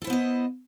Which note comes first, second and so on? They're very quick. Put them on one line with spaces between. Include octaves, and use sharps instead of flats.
A4 E4 C5 B3 D#5